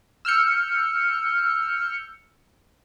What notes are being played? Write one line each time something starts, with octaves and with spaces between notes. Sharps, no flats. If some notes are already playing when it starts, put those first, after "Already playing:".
E6 F6 G6 C#7